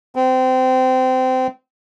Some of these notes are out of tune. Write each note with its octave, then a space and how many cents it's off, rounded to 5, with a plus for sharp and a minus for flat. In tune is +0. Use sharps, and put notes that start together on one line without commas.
C4 -25